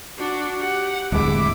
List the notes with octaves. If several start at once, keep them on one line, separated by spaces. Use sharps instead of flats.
D4 F#4
G4 F#5
D1 E2 G#3 E4 D6